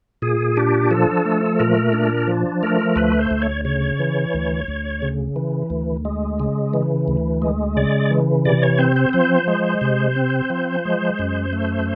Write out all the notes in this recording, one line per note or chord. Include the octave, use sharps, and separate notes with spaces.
A#2 G#4
D4 G4
F3 A4
A3
A#2 A#4
D4
F3
A3 A#4
D2 B4
C5
D2
C#5
C#3 C#5
E3
D2
D2
C#3
E3
D2
G#3
C#3
E3
D2
G#3
C#3 D5
E3
C3 D5
C#5
C4 C5
C5
F3 C5
G#3
C3
C4
F3
G#3
F#2
A3